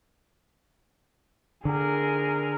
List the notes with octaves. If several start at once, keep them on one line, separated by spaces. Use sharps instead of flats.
D3 G#4 A#4